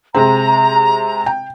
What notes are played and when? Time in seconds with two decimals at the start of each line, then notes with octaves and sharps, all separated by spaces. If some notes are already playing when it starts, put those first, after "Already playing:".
0.15 C3 G#3 C4 A#5
1.26 G5